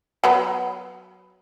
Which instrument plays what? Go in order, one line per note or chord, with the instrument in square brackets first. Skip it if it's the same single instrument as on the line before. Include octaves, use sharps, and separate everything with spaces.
[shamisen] F#3 B3